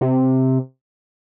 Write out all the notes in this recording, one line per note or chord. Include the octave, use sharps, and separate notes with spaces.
C3